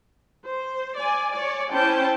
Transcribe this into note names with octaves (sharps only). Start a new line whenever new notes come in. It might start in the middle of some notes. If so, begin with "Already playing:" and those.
C5
D5 G#5
C#5 D5
C#4 E4 C5 G5 A5